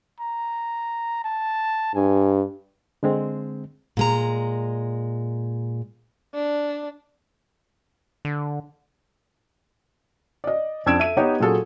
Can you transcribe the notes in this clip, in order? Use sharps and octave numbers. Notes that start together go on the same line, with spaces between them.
A#5
A5
G2 G#5
D3 G#3 C4
A#2 G#3 A#5
D4
D3
D5 D#5
F2 D4 E6 G#6 D7 E7
A4 E5 D#7
B3 D#4 G4 C#5 D#5
A#2 F#3 G#4 A4